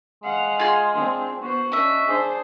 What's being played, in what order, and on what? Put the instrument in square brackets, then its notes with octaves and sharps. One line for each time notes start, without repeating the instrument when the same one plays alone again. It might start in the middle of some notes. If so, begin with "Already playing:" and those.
[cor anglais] G#3 [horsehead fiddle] F5 F#5
[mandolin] F4 G#4 C6
[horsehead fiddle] C4 D4
[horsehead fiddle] B3 C5 [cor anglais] F#4
[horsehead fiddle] C#4 D4 [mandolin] D#5 E5
[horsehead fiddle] D4 C5 [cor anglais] G#4